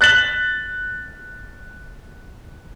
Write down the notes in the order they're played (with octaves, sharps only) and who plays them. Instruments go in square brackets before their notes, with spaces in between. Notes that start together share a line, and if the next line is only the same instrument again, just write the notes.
[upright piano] F#6 A6 B6 F#7